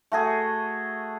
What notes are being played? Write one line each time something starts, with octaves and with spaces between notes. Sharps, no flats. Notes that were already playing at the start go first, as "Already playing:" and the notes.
A3 F#4 G#4